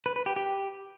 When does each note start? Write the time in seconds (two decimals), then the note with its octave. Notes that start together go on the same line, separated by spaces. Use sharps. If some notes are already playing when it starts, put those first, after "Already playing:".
0.06 B4
0.16 B4
0.26 G4
0.36 G4